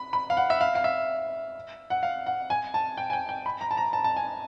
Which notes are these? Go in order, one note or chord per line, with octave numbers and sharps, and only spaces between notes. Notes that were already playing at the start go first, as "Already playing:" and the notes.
Already playing: B5
B5
F5
F#5
E5
F5
F5
E5
F#5
F5
F#5
G#5
A5
G5
G#5
G5
G5
B5
A#5
A5
A#5
A5
A5
G#5